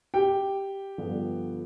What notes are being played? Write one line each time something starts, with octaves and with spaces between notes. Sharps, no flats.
G4 G5
G2 D3 F3 B3